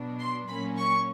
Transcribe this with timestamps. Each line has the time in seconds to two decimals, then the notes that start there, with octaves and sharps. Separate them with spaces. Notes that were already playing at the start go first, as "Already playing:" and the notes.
Already playing: B2 F#3 B3 D4
0.19 C6
0.48 A#2 F#3 A#3 C#4 B5
0.77 C#6